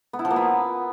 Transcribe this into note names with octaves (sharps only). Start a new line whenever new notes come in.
B3
E4
F3
A#3
B3